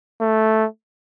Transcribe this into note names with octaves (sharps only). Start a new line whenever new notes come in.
A3